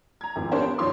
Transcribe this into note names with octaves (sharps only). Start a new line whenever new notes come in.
A#5 G#6
G#1 E2 F3
G3 B3 D4 A#4 C5 C#5
B3
G2 D#3 F3 C#5 C6 D6